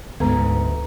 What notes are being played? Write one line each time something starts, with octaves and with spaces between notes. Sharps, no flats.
D2 G#2 C#3 B3 A4 B4 A#5